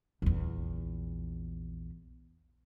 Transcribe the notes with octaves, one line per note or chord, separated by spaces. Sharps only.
A#1 E2